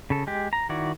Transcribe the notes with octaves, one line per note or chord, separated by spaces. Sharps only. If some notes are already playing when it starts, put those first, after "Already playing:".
C#3 A4
G#3 G4
A#5
D#3 E4 F#4 D5